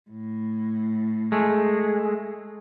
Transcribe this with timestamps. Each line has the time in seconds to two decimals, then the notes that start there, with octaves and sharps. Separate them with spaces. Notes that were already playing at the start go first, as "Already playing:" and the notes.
0.10 A2
1.32 G#3 A3